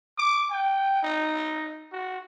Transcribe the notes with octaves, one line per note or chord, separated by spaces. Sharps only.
D6
G5
D#4
F#4